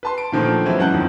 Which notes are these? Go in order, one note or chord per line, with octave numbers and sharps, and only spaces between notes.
B4 A5 C6
D7
A#2 D3 D#3 F3 A3
E3 F#3 G#3 C4 E4
F#2 G#3 F#5 A5 F#6 G6
F2 D#3